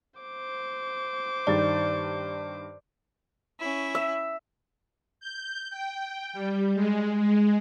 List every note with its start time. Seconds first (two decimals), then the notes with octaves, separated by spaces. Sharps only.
0.20 C5 D6
1.47 G2 D#3 D5 A6
3.59 C#4 E4
3.95 E5
5.20 G6
5.70 G5
6.33 G3
6.75 G#3
7.17 G#3